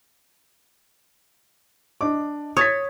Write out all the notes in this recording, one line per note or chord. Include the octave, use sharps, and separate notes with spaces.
D4 D#5 D6
C#5 D#6 A6 B6